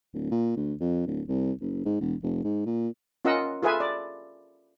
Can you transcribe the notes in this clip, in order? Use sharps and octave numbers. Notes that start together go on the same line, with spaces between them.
D1
A#2
D2
F2
D1
C2
F#1
G#2
E1
F1
G#2
A#2
C#4 F4 A#4 D#5 F#5 E6
F4 G#4 A4 B4 E5 G#5
D5